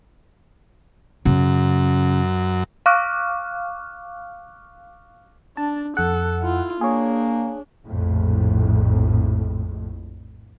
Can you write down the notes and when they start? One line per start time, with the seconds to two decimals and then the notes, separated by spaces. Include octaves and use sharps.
1.25 F#2 C#3
2.86 F5 C#6 D6 F6 F#6
5.57 D4 A5
5.97 F2 A4 F#5
6.40 E4 F4
6.81 A#3 D4 G#4 C#5
7.86 A#1 F2 A2